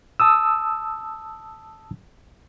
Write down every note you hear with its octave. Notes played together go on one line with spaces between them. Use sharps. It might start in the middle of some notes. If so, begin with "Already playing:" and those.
A5 D#6 E6